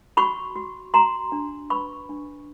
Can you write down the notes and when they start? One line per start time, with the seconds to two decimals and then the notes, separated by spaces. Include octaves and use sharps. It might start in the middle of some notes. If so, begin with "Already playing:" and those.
0.17 F#4 B5 C#6
0.55 F#4
0.94 F#4 A#5 C6
1.32 D4
1.70 B4 B5 C#6
2.09 D4